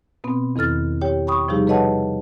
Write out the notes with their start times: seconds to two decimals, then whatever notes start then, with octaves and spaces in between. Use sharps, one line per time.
0.24 B2 B3 C4
0.56 E2 D#3 A4 F6 A6
1.01 G4 C#5 G5
1.27 G5 B5 C#6 D#6
1.48 C3 F3 G3 D#4 G4 G#4
1.67 A4 B4 C#5 D#5 F#5 A5